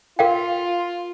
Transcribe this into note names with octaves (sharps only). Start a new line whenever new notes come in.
F4 A#4 F5 G5